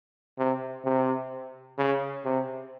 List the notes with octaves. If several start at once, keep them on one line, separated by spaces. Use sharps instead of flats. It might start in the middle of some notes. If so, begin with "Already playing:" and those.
C3
C3
C#3
C3